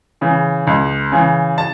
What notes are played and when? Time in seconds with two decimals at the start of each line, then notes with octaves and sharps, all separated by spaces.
0.21 C#3 E3
0.67 C#2
1.12 C#3 E3
1.58 A5